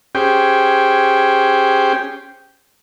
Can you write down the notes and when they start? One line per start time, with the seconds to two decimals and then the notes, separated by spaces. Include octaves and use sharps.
0.15 C#4 G4 G#4 C5 G5